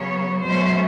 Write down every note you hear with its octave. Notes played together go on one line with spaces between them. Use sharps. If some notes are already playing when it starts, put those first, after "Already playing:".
Already playing: C#3 F#3 B3 C#5
B2 F#3 A3 C#4 C5